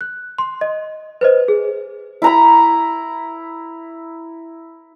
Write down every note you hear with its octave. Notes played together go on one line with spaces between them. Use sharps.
F#6
C6
D#5
B4 C5 D#5
G#4
E4 A#5 B5